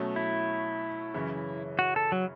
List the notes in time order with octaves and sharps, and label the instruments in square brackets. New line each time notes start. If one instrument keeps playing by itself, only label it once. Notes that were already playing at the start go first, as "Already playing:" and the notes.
Already playing: [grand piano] B2 F#3 A3 C#4
[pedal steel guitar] E4
[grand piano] F#2 C#3 E3 C#4
[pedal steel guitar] F#4
A4
F#3